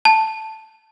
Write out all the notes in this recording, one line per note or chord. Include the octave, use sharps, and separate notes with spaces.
A5